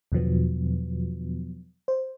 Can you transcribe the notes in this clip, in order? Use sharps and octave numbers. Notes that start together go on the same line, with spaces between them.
E2 B2 D3 F3 F#3 B3
C5